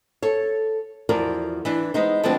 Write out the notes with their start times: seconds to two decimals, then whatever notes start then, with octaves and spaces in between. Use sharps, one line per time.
0.22 A4 C#5
1.09 E2 F3 F#4 A#4 D5
1.65 E3 D4
1.94 G#3 B3 D#4 C5
2.23 D3 F3 G#3 B3 C4 D4